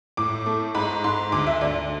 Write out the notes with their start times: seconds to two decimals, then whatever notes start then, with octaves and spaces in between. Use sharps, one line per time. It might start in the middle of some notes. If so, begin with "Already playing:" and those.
0.17 A2 D6
0.46 A3
0.75 G#2 B5
1.04 G#2 C6
1.32 D2 D6
1.47 E5
1.61 D2 D5